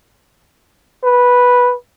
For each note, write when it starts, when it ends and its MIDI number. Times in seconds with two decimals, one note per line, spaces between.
1.04 1.74 71